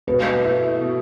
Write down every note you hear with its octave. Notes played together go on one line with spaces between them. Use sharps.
B2 B4
A3 E4
B2